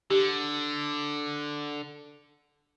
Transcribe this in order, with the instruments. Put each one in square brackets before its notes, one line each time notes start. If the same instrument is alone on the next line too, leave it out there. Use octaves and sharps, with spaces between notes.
[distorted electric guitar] D3 [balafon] G4